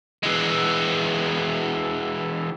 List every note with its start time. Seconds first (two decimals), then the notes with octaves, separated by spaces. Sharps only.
0.23 E3 G#3